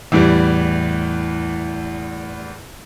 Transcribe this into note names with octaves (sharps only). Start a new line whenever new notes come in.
E2 A2 E3 G3